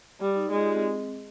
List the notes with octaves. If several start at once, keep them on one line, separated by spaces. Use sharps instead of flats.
G3 D5
D#4
G#3 F4
G4
C4